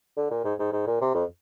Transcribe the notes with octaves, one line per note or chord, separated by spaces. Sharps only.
D3
A#2
G#2
G#2
G#2
A#2
C3
F2